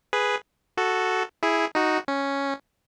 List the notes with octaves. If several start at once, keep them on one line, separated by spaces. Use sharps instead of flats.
G#4 B4
F#4 A4
E4 G#4
D#4 F#4
C#4